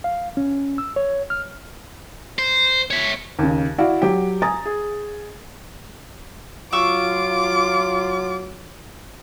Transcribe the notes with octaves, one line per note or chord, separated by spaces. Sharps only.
F5
C#4
E6
C#5
F6
C5
C#5 E5
D#2 C#3
E4 F#4 D5 F5
F#3 G4
G#5 A#5 D#6 A6
G#4
F#3 F4 C#6 D6 E6